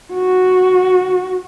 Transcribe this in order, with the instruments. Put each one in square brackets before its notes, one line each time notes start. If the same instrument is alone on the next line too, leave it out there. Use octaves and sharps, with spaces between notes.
[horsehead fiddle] F#4